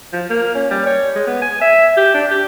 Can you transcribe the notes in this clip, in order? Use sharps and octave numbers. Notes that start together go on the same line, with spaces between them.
F3
A#3
C#4
G3
C#5
G#3
B3
G#5
E5
G4
D4
G4